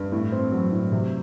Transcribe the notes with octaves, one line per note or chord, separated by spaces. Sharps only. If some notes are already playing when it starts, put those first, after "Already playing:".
Already playing: G2
A2
C4
F#3
A2
C3